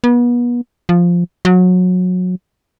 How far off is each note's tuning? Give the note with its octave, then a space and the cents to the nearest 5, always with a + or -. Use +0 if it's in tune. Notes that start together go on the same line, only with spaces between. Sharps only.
B3 -35
F3 +0
F#3 -25